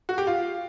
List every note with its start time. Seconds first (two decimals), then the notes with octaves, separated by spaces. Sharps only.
0.09 F#4
0.18 G4
0.27 F4